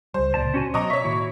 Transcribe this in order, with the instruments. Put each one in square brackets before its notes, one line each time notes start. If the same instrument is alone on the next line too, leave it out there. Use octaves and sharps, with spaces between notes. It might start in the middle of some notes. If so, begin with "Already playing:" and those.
[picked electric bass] C#2 G3 [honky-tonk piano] C5
[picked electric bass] D1 C#2 A#2 [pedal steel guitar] D5 A5
[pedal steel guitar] C#4 F#4 G#5
[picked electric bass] B2 [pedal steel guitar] F#3 C#6 D6 [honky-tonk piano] D#5 A#5
[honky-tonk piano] C#5 C#6 [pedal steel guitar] E5
[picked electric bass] A2 D#3 A#3 [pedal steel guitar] E4 F#4